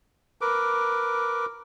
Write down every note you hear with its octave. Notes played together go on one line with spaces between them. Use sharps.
A#4 B4 D6